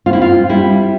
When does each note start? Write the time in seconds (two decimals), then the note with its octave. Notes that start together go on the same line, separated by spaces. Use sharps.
0.06 C4 F4
0.13 E4
0.22 F4
0.49 G3 E4